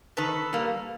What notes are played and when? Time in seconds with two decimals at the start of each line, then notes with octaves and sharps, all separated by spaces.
0.17 D#3 A4 B4
0.53 G3 A#3